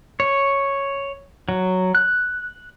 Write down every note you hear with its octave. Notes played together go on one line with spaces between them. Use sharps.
C#5
F#3
F#6